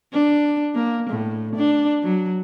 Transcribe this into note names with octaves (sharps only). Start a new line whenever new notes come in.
D4
A#3
A2
D4
F#3